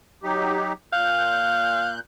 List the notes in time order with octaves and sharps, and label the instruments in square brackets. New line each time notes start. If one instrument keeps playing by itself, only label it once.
[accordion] F#3 D#4 G4
[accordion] A#2 F#6 G6 [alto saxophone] F5